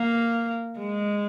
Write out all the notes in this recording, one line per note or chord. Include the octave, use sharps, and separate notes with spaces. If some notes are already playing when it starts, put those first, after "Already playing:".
Already playing: A#3
G#3